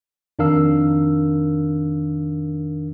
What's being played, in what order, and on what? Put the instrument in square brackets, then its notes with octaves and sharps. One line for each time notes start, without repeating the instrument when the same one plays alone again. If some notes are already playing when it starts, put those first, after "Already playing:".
[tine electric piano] F2 D#3 D4 A#4 F5 E6